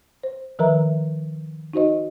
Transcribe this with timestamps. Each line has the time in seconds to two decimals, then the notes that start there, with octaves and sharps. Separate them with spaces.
0.23 C5
0.59 D#3 F3 A#4 B4 E5 A#5
1.74 D#4 F#4 C5 D#5